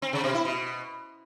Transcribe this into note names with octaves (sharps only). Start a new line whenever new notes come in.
C4
C3
B2
E4
B2